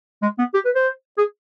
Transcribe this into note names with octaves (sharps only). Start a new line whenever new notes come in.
G#3
B3
G4
B4
C5
G#4